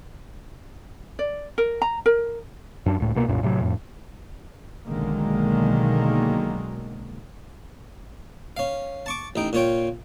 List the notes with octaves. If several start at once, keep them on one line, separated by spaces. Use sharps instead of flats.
D5
A#4
A#5
A#4
F#2 D4
C#2 A2
C2 B2 A#3
C2 F#2 A#2
A2 C3 E3 F#3
F2 A2
B1 D3 D#3 F#3 G#3 A#3
C#4 F5
A5 C#6 D6
A1 D#4 G5
A#2 F4 C#5 G5